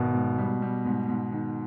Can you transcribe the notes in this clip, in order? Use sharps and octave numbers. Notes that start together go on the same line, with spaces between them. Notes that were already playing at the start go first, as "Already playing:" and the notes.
Already playing: G#1 B2
G#2
G3
G3
G#2
G#2
D#3